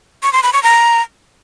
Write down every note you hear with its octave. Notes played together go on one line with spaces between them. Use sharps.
C#6
C6
B5
C#6
A#5